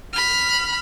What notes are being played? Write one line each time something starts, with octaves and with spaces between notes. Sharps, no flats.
B5 F6